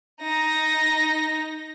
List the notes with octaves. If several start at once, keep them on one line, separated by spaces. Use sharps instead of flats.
D#4 A#6